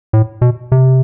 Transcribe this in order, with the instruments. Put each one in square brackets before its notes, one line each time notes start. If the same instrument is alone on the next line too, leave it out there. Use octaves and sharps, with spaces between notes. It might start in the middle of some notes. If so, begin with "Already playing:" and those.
[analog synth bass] A2
B2
C3